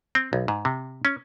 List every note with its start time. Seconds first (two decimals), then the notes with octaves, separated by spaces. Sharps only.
0.15 C4
0.33 B1
0.48 G#2
0.65 C3
1.05 C#4